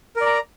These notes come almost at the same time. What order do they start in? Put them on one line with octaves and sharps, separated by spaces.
A#4 D5 A#5